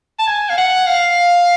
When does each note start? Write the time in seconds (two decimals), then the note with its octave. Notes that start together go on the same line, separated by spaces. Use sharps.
0.19 A5
0.27 G#5
0.49 F5
0.57 F#5
0.86 F5